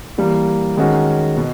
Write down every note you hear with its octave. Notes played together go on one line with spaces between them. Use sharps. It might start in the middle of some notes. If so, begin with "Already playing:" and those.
E3 G3 A#3
D#3 G#3 C#4 F#4
B2